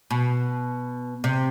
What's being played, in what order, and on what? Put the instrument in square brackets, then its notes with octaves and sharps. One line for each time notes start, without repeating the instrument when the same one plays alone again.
[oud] B2
C3